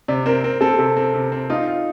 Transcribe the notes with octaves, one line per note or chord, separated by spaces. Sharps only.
C3 D5
C4 A#4
C4 A#4
C4 A4
C3 A4
C4
C3
C4
D#4 F4
F4